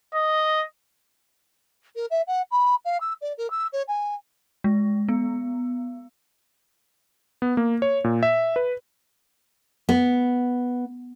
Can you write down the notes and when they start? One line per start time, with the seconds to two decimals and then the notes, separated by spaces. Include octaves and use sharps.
0.14 D#5
1.95 A#4
2.10 E5
2.27 F#5
2.51 B5
2.85 F5
3.01 E6
3.21 D5
3.38 A#4
3.50 E6
3.73 C#5
3.88 G#5
4.64 G#3
5.09 B3
7.42 B3
7.57 A#3
7.82 C#5
8.04 A#2
8.23 E5
8.56 B4
9.89 B3